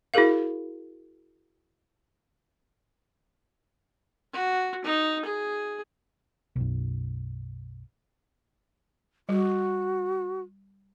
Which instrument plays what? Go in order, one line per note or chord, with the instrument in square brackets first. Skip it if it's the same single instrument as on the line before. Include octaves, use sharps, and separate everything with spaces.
[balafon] E4 F#4 G#4 A#4 F5
[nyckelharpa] F#4
D#4
G#4
[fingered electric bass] B1 F#2
[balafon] G3 [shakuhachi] F#4